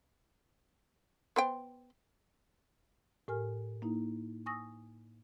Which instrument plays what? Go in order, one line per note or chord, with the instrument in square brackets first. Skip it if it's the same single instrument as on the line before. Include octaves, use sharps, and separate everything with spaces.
[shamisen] B3 C5 G5
[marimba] A2 G4 A#4 G#5 F6
A#3 D#4 E4
G#5 C#6 D#6 E6 A#6